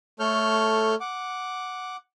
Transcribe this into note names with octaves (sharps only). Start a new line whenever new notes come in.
A3 A4 C#5 F6 G6
F#5 D6